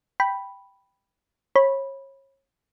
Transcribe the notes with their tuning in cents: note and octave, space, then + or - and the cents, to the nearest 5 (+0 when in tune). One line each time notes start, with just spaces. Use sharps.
G5 +0 B5 +0
C#5 -30 B5 -10